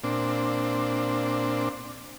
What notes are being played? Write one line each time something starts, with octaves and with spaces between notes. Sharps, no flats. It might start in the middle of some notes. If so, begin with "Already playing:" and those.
A#2 C4 D4